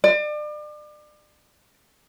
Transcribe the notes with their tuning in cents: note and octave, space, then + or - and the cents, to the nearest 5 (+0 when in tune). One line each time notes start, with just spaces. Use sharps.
D5 +35